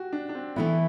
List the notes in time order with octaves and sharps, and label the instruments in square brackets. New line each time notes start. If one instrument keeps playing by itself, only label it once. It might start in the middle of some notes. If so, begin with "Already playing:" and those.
Already playing: [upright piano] F#4 G4
D4
D4
C4
[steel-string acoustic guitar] E3 A3 E4 [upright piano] B3